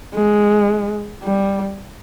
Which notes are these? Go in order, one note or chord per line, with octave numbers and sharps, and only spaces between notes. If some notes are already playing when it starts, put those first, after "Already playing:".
G#3
G3